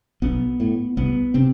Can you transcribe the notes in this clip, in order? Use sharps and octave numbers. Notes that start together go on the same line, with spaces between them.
B1 B3
A2
C2 B3
C3 C4